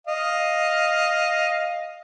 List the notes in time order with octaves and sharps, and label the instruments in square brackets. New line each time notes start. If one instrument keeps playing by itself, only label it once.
[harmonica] D#5 F5